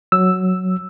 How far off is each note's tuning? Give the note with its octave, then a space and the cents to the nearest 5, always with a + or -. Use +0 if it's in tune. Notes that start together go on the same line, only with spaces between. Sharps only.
F#3 +0 E6 +0